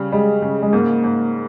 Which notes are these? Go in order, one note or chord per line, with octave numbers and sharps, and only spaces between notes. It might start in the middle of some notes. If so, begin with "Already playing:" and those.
Already playing: C#3 G3
G3 G#3
C#3
G#3
G#2 A#3
G#2